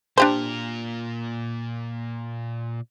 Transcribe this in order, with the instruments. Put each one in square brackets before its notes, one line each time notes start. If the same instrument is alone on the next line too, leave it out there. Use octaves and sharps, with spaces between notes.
[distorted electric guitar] A#2 A#4 [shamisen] D4 G4 C5